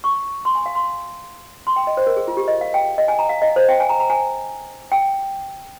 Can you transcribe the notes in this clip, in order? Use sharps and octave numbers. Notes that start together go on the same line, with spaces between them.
C#6
C6
G#5
F5
C6
C6
G5
D#5
C5
A#4
G#4
F4
G4
D#5
F5
G5
D#5
G#5
A#5
F5
D#5
C5
G5
G#5
A#5
A#5
G#5
G5